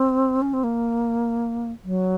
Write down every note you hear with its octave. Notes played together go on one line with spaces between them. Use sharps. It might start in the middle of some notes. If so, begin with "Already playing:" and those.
Already playing: C4
C#4
C4
A#3
F#3